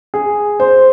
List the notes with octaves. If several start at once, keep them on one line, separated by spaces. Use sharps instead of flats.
G#4
C5